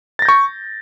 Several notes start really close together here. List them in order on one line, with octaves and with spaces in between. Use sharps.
A6 A#6 G6 C#6